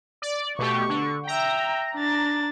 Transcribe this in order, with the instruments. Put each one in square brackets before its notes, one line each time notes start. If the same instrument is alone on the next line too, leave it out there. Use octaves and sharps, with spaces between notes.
[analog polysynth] D5
[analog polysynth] B2 A3 G4 [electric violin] C#6
[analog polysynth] D3
[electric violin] E5 G5 [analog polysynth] A#5
[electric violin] D4 A6